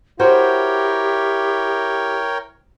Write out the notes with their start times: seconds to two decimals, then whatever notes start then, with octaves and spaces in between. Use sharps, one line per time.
0.20 E4 F#4 G4 A#4 C5 C#5 G5